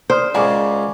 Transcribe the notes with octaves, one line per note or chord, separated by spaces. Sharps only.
C5 D5 D#6 F6
C#2 C#3 G#4 A#4 D5 F#5 C#6